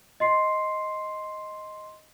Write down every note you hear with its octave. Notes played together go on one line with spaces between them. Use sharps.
D#5 C6 C7